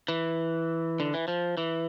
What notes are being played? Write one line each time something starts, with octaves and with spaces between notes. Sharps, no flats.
E3
D3
E3
F3
E3